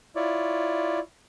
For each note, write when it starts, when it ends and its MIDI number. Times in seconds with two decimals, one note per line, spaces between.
0.16 0.99 64
0.16 0.99 65
0.16 0.99 73
0.16 0.99 74